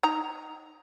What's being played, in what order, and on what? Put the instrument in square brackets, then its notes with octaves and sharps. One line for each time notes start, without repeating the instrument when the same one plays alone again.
[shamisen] D#4 A#5